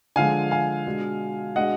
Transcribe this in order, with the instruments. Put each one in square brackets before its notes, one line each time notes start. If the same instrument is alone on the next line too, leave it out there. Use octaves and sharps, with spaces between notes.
[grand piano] D3 F3 G#3 F5 G#5
F5 G#5
B2 G#3 D4
B2 G#3 D4 D#5 F#5